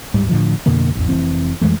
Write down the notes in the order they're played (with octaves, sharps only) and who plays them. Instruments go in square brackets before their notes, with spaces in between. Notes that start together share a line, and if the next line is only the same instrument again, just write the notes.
[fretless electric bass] D1 G#2 G3
A2 D3 F3
F2 B2 D3 A#3
A1 E2
F1 E3 C4
F2 E3 G#3 A3